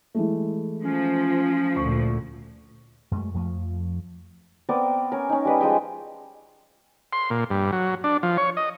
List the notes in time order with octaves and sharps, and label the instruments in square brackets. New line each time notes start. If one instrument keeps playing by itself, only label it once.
[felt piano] E3 G#3 A3
[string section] F3 [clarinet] C#4
[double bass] D2 A#2 [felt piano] C#6
[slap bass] F#2 G#3 A3
F2 F3 A3
[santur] B3 C4 A#4 D5
C#4 A#4
C#4 D#4
G3 B4 D#5
F3 G#3 D#5 G5
[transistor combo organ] C6
A#2
G2
F#3
D4
F3
C#5
D#5